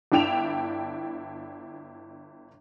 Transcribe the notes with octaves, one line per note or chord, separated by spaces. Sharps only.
G1 D4 E4 G5 E7 F7